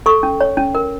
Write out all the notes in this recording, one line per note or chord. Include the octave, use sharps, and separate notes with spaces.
A4 C#6
C#4
C#5
C#4
A#4